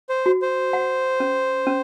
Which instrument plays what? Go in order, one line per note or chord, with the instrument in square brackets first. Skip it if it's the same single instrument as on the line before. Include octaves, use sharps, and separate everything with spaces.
[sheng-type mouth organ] C5
[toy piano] F#4
[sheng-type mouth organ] C5
[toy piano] F#5
C#4
C#4